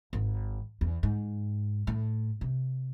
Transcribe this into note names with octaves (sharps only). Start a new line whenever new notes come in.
G#1
E2
G#2
A2
C3